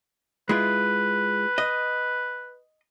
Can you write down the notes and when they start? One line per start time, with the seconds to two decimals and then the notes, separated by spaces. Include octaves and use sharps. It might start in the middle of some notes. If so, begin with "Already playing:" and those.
0.49 G#3 E4 F4 B4
1.58 D#5